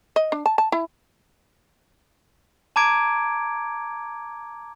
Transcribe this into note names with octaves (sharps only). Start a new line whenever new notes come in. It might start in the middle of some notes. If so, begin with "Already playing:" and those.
D#5
D4
A5
A5
E4
A5 A#5 D6 G#6 D7